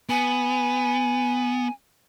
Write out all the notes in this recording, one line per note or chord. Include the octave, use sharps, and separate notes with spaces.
B3 G#5